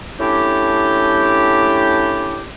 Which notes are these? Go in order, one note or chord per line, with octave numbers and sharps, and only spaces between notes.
A3 C#4 D4 E4 G4